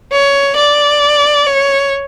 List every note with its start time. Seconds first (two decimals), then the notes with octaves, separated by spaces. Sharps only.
0.13 C#5
0.56 D5
1.47 C#5